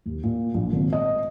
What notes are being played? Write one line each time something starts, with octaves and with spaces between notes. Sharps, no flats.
D#2
A#2
A#1
G#1
D#5